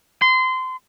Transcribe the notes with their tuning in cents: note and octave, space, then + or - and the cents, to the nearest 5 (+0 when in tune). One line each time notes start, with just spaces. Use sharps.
C6 -25